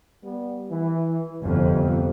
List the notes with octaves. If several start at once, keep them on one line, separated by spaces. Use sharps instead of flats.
G3 B3
E3
G1 F2 C3